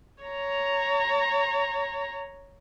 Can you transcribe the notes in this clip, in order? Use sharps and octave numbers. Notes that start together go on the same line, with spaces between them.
C#5 A#5